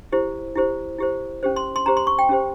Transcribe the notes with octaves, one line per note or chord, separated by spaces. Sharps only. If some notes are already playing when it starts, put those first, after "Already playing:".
E4 G4 C5
E4 G4 C5
E4 G4 C5
C#4 G4 C5
C6
C6
C#4 G4 C5 A#5
C6
C#6
G5
C#4 G4 C5